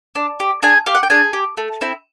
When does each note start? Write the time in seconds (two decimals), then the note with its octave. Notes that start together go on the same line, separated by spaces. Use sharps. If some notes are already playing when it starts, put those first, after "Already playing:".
0.15 D4
0.40 G4
0.63 D4 G#4 G#5
0.86 G4 F5
0.95 F#5
1.03 G5
1.10 D4 G#4 G#5
1.33 G4
1.57 A3
1.81 C4 E4